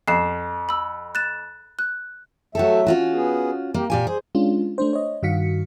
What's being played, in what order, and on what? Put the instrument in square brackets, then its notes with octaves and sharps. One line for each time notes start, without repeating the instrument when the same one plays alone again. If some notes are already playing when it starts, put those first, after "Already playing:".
[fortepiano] F2 [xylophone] C7 E7
[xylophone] B5 E6
F#6 A6 E7
F#6
[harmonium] F#3 A3 E5 [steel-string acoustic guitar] F#4 G4 A4
[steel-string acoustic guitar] C#4 F4 F#4
[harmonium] B3 G#4
[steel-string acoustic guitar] A#3 [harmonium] G4
[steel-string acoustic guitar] A#2 G4 G#5 [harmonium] F5
[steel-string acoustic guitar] G#4 [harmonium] C5
[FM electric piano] G#3 C#4 D4 F4
A3 D4 C5
C#5 D#5
G2 D#3 F#4 F5 B6 C#7